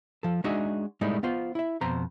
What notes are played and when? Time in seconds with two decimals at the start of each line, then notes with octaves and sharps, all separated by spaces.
0.23 F3 A4
0.44 G#3 D4 D#4 F#4 G#4 E5
1.01 A2 G3 G#3 A#3 D#4 E4
1.23 B3 F4 C5
1.55 E4 E5
1.81 F2 B2 C5 A#5